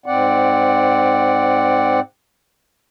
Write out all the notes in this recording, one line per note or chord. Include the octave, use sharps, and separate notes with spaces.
G#2 C4 D5 F#5